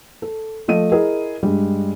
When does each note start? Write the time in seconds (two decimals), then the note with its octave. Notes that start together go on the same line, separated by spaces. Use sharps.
0.22 A4
0.68 F3 A3 D#5 D#7
0.92 E4 G#4 A#4 D#5
1.42 G2 G3 G#3